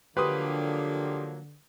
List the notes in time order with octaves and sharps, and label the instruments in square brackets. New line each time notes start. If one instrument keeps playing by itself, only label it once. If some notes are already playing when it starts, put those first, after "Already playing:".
[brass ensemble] D3 [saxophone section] F3 F#3 A#3 [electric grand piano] G4 C6 D#6 [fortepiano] B4